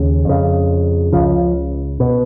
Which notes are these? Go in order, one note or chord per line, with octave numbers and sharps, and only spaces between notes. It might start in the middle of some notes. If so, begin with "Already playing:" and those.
Already playing: D#2 C#3
F2 C#3
C#2 C#3 F3
B2